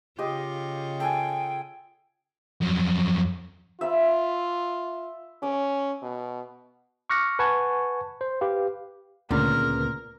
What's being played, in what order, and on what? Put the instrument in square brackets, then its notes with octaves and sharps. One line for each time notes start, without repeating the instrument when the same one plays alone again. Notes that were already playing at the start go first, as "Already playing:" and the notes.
[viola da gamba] C#3 F4 [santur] G4 D#5
[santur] A4 G#5 [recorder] G5
[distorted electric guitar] F2 F#3
[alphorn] F4 [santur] E5 B5
[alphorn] C#4 [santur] D6
[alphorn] B2
[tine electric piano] C#6 D6 F6 F#6 A#6 C#7
B4 F#5 G#5 A5 C#6 G#6
C5
G4 B4 F5
[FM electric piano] D2 C#3 B3 [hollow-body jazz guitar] A#2 [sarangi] A#4